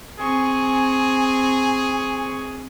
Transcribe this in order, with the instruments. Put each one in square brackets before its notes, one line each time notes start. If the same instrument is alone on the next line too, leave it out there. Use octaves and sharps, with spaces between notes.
[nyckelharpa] C4 C#6 [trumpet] G#4 [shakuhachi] G#5